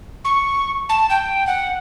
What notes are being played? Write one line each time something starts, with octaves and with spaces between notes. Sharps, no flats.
C#6
A5
G5
F#5